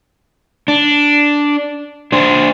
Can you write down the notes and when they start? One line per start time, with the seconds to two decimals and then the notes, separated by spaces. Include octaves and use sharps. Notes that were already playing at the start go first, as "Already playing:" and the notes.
0.68 D4
2.12 D4 C5